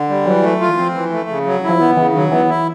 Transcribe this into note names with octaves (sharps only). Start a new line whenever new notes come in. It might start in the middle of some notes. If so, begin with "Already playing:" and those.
Already playing: D3
G3
E3 F#3
A3
F4
E3
F3 C4
E3
A3
C#3
F#3
E4
F3
E3 B3
C#3 E3
D#3 F#3
E3 B3
E4